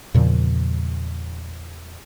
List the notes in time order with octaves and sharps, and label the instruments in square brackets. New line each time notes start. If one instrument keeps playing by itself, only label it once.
[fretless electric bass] E2 A#2 C#3 F3